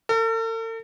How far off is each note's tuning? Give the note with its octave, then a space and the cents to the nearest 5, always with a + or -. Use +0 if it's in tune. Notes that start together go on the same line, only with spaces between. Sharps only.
A4 +45